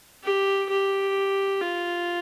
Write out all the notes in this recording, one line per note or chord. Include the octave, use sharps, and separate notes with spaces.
G4
G4
F4